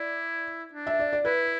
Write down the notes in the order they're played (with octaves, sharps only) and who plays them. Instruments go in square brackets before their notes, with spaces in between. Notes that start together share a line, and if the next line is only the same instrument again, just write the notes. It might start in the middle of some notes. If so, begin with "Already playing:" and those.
Already playing: [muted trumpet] E4 [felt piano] D5
[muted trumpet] D4
[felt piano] E5
D5
D5
[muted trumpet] E4 [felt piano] B4